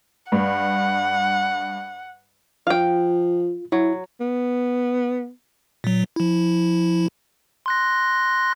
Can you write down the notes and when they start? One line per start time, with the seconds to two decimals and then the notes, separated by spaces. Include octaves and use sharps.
0.32 G2 F#5
2.67 F3 F4 F5 G5
3.72 F#3 E4
4.21 B3
5.84 A#2 F#3
6.16 F3 E4
7.66 C6 F#6 A#6